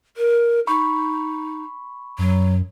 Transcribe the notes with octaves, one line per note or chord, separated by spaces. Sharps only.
A#4
D#4 B5 C#6
F#2 F#3